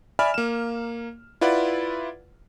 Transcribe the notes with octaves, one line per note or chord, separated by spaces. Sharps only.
D5 E5 G#5 B5 F6
A#3 E7
E4 F4 B4 D5 F#5